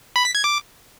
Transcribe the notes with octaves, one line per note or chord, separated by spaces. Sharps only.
B5
B6
G#6
D6